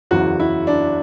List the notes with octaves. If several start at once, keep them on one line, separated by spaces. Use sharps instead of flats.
F#1 E2 C#3 E3 F#4
E4
D4